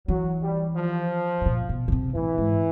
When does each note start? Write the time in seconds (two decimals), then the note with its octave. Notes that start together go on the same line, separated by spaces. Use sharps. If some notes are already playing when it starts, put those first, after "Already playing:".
0.08 E3 F#3
0.43 G3
0.77 F3
1.41 B2
1.46 A#2
1.69 B2
1.88 C#3
1.92 C3
2.15 A2 E3
2.38 G#2